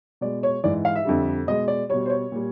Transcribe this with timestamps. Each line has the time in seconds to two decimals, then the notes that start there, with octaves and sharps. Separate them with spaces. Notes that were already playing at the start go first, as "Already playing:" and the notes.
0.21 B2 G#3 D5
0.43 C#5
0.63 G#2 E3 G#3 D5
0.85 F5
0.95 E5
1.05 F2 D3 G3
1.47 B2 G#3 D#5
1.68 D5
1.89 B2 G3 C#5
2.06 C5
2.10 C#5
2.32 A#2 G3